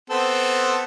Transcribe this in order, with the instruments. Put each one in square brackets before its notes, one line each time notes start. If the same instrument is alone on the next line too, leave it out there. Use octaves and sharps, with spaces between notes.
[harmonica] B3 C4 A4